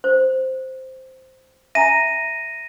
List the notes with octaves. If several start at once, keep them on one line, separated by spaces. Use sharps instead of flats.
C5
E5 G#5 A#5 A#6 D#7